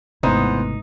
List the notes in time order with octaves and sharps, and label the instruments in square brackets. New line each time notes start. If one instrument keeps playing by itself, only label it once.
[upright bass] G#1 E4 [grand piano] E2 B3 C5 [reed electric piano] C3 A3 [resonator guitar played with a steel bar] D#4